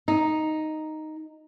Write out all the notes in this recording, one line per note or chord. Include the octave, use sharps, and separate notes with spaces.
D#4